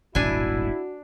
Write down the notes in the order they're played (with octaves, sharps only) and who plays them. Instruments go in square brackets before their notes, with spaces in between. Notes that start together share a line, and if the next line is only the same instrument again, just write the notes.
[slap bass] D#1 G#1 B2 [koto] D4 G#5 [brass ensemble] E4 [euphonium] F#4